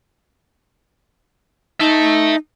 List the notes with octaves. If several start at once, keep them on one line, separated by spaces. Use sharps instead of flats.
D#4 E5 A5